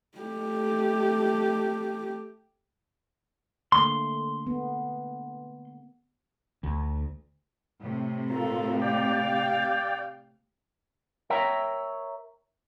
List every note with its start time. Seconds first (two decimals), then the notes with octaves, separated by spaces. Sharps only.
0.18 A3 G4
3.72 D3 A3 A#3 C6
4.47 B3
6.63 D2
7.81 A2 C3
8.31 F4 A4 A#4
8.81 G4 D5 F5 G5
11.30 A#4 C#5 E5 G5 A#5